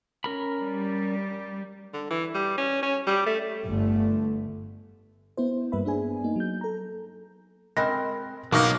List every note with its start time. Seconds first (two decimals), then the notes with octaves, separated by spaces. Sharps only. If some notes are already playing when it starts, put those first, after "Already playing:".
0.24 C#4 A#4 B5
0.61 G3
1.93 D3
2.10 E3
2.34 G3
2.58 C#4
2.82 C#4
3.06 G3
3.26 A3
3.65 G1 D3 A3
5.37 B3 E4 C5
5.72 G2 G3 A#3 B4 E5 B5
5.85 B3 D4 G#4 G#5
6.24 A#3 D#4
6.36 F#3 G6
6.61 A4 A#5
7.77 G#3 C4 A#4 B5 F#6 A#6
8.52 B1 B2 A#3 D#4 F#4 C#6 F6 A#6